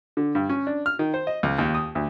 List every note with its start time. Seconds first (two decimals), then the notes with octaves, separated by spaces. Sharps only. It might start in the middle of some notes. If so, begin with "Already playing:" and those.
0.17 D3
0.35 G2
0.49 C#4
0.67 D4
0.86 F6
0.99 D#3
1.14 C5
1.27 D#5
1.43 C#2
1.59 D#2
1.75 D#6
1.95 D2